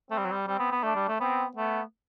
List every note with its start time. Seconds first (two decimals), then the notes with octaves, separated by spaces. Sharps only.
0.11 A3 C4
0.18 G3
0.25 F#3
0.32 G3
0.47 G3 C4
0.59 B3
0.71 B3
0.83 A3 D4
0.96 G3
1.08 A3
1.20 B3 C4
1.56 A3 B3